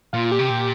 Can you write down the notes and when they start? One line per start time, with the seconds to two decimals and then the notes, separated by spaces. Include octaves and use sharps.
0.13 A#2 F4
0.32 G4
0.39 C3
0.48 A#2 G4